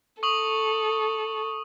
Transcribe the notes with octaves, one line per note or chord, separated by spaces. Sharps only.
A4 C#6 D#6 F#7